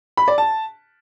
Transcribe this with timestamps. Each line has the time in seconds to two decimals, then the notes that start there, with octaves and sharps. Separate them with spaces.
0.17 B5
0.28 D5
0.38 A5